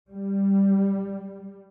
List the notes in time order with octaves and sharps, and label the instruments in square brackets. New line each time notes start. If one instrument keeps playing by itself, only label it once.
[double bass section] G3